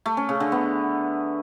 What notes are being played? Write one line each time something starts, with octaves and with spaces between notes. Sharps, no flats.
A3
C#4
C#3
D3
B3